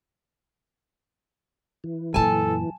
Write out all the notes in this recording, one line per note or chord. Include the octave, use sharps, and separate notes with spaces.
E3
F#2 A#2 A4 G#5 A5